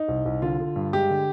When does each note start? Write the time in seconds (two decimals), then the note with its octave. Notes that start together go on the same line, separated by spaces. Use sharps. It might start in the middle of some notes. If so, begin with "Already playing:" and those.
Already playing: D#4
0.08 C2
0.25 C2
0.42 D3 F4
0.60 D3
0.76 G2
0.93 G#3 G4
1.10 D3